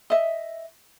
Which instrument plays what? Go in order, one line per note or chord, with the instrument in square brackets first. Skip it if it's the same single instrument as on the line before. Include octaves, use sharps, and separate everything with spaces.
[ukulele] D#5 E5